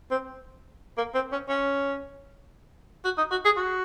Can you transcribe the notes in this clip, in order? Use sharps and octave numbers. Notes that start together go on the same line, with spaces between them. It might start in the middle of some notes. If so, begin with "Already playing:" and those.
C4
A#3
C4
C#4
C#4
F#4
D#4
F#4
G#4
F#4